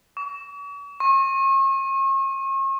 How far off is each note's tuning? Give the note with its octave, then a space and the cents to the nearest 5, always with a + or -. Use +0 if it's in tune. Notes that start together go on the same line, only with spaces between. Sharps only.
C#6 +45
C#6 -40